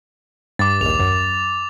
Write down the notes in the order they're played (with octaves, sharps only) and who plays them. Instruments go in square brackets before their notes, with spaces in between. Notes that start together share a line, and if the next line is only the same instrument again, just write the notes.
[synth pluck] G2 [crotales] D6 A6
[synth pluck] A#1 D#2 [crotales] F7
[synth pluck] F#2